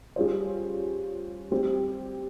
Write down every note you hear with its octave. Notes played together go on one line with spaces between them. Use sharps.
G3 C#4 F4 G#4 C5
G3 C4 G4